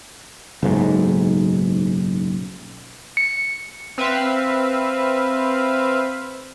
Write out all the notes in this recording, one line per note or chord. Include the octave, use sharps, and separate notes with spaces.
F#1 B1 G#2
C#7
C4 B4 E5 F5